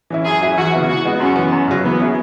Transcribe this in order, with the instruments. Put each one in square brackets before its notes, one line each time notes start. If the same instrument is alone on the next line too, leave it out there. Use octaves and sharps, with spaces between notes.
[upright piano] E3 C#4 E4
[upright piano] F#2 [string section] G#4
[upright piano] F#3 E4 G#4
[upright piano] E2 [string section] F#4
[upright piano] C#3 E3 B3 E4
[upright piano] E3 [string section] F#4
[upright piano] G#3 B3 F#4
[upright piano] F#2 [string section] C#4
[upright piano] E3 B3
F#2
C#3 F#3
[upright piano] E3 [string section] B3
[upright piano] C#4 E4 G#4